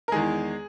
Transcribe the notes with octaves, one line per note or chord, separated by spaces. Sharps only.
A#4
E2 D#3 G#3 G#4